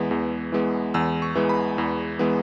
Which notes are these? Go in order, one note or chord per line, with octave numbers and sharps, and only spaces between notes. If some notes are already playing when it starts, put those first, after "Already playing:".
Already playing: E2 E3 G#3 B3
E2
E3 G#3 B3
E2 E6
C#6
E3 G#3 B3
B5
E2
E3 G#3 B3